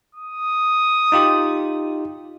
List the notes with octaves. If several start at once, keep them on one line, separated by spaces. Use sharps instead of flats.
D#6
D#4 F4 G4